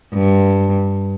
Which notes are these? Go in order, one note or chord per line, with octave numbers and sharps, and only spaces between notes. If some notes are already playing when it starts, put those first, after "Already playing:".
G2